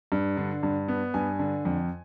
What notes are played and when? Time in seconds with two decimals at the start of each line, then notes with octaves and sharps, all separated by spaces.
0.12 G2
0.37 D3
0.63 G2
0.88 B3
1.14 G2 G#5
1.39 D3
1.65 F2